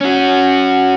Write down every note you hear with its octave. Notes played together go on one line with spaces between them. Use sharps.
C#4 F#4